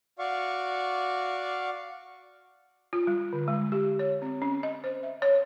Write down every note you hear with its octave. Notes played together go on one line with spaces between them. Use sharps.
F#4 D5 F5 C#6
F4
G3
D3
G#3
G4
C#5
C4
C#4
D#5
C5
E5
C#5